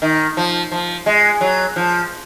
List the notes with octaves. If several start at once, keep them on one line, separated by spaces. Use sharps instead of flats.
D#3
F3
F3
G#3
F#3
F3